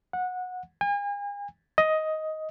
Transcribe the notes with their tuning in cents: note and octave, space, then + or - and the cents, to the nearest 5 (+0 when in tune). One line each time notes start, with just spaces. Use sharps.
F#5 -20
G#5 -40
D#5 +10